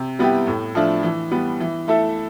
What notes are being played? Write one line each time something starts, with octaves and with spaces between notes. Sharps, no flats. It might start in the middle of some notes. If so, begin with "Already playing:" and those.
Already playing: C3
G3 B3 E4 G4
A2
F3 A3 D4
E3
G3 B3
E3
A3 E4 A4